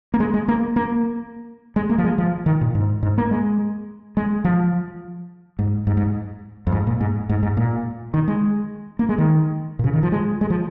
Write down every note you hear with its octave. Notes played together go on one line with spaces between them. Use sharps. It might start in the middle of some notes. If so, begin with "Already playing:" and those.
A#3
G#3
G#3
A#3
A#3
G#3
A#3
F3
G#3
F3
D#3
A#2
G#2
G#2
A#3
G#3
G#3
F3
G#2
G#2
G#2
F2
G#2
A#2
G#2
G#2
G#2
A#2
D#3
G#3
A#3
G#3
D#3
A#2
C#3
D#3
F3
G#3
G#3
F3